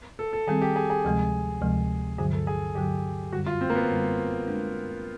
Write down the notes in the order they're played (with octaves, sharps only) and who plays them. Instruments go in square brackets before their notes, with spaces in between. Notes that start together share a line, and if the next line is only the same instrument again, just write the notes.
[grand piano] A4
A4
[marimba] D#3 G3 C4 [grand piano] G#4
[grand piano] G4
G#4
G#4
[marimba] D2 C3 F3 G#3
D2 C3 F3 G#3
[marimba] G2 D3 F#3 [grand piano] G#4
[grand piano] A4
G#4
[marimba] G2 D3 F#3 [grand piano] G4
[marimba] F#2 D3 G3 [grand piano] F#4
[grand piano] F4
C4
A#3
B3
[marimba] F#2 D3 G3
G#3 B3 D4